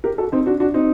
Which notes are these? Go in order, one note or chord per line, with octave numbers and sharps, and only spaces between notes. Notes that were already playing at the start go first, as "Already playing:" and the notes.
G4 A#4
F#4 A4
C4 D#4
D4 F#4
D4 F#4
C4 D#4